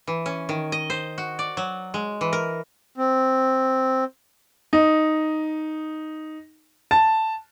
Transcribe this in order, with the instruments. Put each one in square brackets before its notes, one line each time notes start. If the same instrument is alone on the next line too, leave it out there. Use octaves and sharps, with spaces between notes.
[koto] E3
C#4
D#3
D#5
C5
F#4
D5
F#3
G#3
E3
A#4
[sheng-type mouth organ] C4
[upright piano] D#4
A5